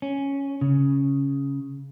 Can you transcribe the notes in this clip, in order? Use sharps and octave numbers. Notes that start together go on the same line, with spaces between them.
C#4
C#3